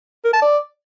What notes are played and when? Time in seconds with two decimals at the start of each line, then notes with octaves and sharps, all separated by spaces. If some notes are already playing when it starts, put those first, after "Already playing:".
0.25 A#4
0.33 A5
0.42 D5